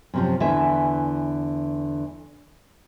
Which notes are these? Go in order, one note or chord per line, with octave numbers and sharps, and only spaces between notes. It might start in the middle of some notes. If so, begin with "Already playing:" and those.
F#2 C3 F3
E2 D3 E3 B4 E5 G#5